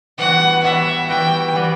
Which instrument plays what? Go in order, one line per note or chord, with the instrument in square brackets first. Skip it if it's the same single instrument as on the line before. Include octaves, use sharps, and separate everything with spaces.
[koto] E3 G3 B3 F#4 [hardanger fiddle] F#5
[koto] E3 G3 B3 F#4 [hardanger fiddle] E5
[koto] E3 G3 B3 F#4 [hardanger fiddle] G5
[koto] E3 G3 B3 F#4